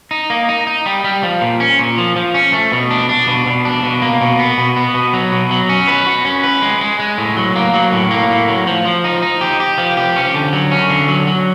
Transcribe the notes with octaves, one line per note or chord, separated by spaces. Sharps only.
D#4
A#3
D#4
D#4
G3
G3
F3
A#2
C#4
A#2
F3
F3
C#4
A3
B2
D4
D4
B2
B2
D4
B2
A#3
B2
B3
B2
B3
B2
F#3
B2
F#3
C#4
B4
F#4
C#4
B4
G#3
G#3
G#3
A2
F#3
A#3
F#3
A2
A#3
A2
F#3
F3
F3
D#4
D#4
G4
G4
F3
G4
C#4
D3
F#3
C#4
D3
F#3
F#3